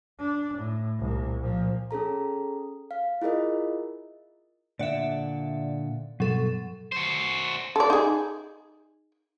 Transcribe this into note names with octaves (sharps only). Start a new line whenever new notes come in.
D4
A2
C2 A#2
A#2 F3
C#4 G#4 A4 A#5
F5
E4 F4 G#4 A#4 D#5
A#2 D3 D5 E5 F#5
G2 B2 F#3 A4
F#4 C5
A4 D5
D#4 G#4